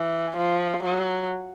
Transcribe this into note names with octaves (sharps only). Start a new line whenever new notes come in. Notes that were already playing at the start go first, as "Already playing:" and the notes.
Already playing: E3
F3
F#3